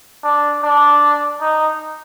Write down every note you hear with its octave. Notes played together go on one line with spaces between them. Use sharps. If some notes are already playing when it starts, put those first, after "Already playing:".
D4
D4
D#4